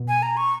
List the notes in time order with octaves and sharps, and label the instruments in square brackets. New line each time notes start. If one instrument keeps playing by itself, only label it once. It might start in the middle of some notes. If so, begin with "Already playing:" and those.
Already playing: [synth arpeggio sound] B2
[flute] G#5
A#5
C#6